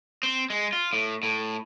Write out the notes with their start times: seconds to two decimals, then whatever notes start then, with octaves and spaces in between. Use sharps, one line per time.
0.23 C4
0.50 G#3
0.73 F4
0.93 A2
1.23 A2